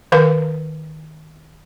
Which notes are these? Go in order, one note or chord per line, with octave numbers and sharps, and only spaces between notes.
D#3 A#4 B4 F5